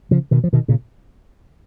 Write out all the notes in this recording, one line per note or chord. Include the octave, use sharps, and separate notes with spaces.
C#3 F3
B2 D#3
F3
B2 D#3
A#2 C#3